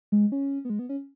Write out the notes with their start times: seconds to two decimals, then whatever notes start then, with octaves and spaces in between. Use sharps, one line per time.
0.12 G#3
0.32 C#4
0.65 B3
0.70 G#3
0.79 B3
0.89 C#4